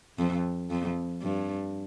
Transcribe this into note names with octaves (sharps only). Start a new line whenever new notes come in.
F2
F2
G2